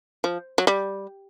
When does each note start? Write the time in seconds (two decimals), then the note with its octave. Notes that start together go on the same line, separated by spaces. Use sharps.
0.24 F3
0.58 F#3
0.67 G3